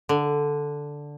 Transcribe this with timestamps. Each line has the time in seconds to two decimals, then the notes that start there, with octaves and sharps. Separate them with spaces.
0.09 D3